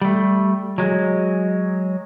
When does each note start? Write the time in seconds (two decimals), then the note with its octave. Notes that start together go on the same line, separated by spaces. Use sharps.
0.01 G3 A3
0.78 F#3 G#3